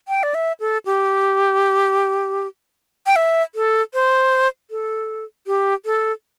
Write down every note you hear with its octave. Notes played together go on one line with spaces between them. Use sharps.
G5
D5
E5
A4
G4
G5
E5
A4
C5
A4
G4
A4